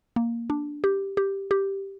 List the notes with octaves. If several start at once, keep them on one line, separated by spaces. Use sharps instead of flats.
A#3
D4
G4
G4
G4